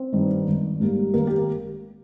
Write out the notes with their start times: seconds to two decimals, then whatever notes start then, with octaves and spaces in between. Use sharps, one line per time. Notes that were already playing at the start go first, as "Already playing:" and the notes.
Already playing: C4 C5
0.12 G2 D#3
0.46 G#1
0.80 G#2 G3 A#3
1.14 G#1 A#3 A#4
1.27 G4